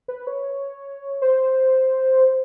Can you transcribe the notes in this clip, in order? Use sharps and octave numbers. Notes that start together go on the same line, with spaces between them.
B4
C#5
C5